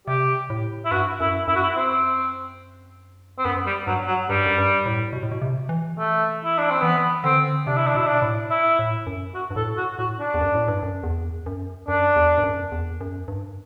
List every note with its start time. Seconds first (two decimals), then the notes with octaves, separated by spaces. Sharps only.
0.07 C3 G4
0.50 A2
0.85 E4
0.92 G2 F#4
1.20 F#2 E4
1.47 F#2 E4
1.56 F#4
1.63 E4
1.77 C4
3.38 C4
3.45 F#2 B3
3.66 G3
3.87 G2 F#3
4.07 F#3
4.29 G2 G3
4.46 F#2
4.58 G2
4.86 A2
5.13 B2
5.23 A2
5.32 B2
5.42 C3
5.69 E3
5.98 A3
6.45 E4
6.58 D4
6.70 C4
6.82 E3 B3
7.24 D3 C4
7.67 C3 D4
7.77 E4
7.86 D4
7.95 B2 E4
8.06 D4
8.22 A2
8.51 E4
8.79 A2
9.07 F#2
9.34 F#4
9.50 G2
9.56 A2 A4
9.77 F#4
9.98 A2 F#4
10.20 D4
10.34 E2
10.41 F#2
10.55 A2
10.68 G2
10.83 F#2
11.03 E2
11.46 F#2
11.88 F#2 D4
12.16 E2
12.38 G2
12.43 F#2
12.72 E2
13.01 F#2
13.28 G2